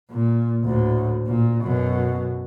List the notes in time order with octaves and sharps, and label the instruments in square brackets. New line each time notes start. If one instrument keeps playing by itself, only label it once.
[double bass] A#2
D2 A2
A#2
F#2 B2